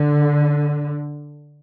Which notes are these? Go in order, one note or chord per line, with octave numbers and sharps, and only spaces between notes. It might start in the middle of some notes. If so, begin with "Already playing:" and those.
Already playing: D3